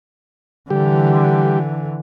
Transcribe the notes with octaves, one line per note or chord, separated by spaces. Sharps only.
D3 E3 G3 G4